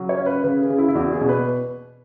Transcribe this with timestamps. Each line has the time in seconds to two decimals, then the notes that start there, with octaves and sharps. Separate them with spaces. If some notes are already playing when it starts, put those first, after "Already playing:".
Already playing: C#3 F#3
0.09 C#5
0.18 C#4
0.26 B4
0.44 C#3 B4
0.61 G#4
0.70 C#3
0.78 E4
0.88 E4
0.95 E2 F#4
1.12 G#4
1.21 B2
1.29 B4